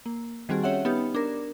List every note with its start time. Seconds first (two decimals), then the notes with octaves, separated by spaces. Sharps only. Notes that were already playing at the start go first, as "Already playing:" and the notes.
0.06 A#3
0.49 D#3 G3 C4 F#4 G#4
0.63 C#4 C#5 E5 F#5
0.85 B3 D#4 G4
1.15 D4 A#4